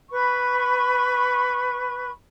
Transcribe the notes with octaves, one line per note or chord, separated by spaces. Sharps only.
B4 B5 C#6